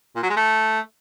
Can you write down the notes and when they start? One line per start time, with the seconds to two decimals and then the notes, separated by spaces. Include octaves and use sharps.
0.16 A#2
0.23 F#3
0.30 G#3
0.37 A3